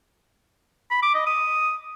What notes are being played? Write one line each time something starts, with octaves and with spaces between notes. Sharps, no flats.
B5
D6
D#5
D#6